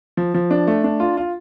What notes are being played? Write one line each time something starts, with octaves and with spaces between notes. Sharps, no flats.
F3
F3
D4
A3
D4
F4
F4